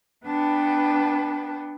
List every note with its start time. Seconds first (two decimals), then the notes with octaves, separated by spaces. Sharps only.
0.25 B3 D4 B4 F#5 G5 A5